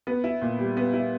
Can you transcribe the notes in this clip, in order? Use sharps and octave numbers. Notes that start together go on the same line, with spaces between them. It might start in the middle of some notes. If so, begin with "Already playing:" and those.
B3
E4
A#2
G3
B3
E4